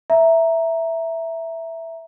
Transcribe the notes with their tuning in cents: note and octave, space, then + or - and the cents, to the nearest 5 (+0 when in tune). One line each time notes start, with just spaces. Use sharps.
E5 +0 A#5 +0